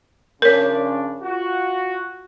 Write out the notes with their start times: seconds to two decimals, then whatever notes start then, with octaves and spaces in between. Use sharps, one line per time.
0.42 C#3 F3 D4 A#4 C#5
1.21 F4 F#4